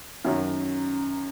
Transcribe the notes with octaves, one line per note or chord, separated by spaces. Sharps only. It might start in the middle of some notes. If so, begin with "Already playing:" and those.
F#2 D#3 F#3